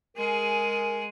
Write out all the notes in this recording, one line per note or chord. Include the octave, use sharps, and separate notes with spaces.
G#3 G#4 A#4